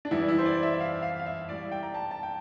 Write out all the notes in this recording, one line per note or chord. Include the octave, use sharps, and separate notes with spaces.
D4
E2 E3 G3 E4
E4
C5
D5
E5
E5
F5
F5
F5
E5
A2 G3 D5
G5
A#5
A5
A5
G5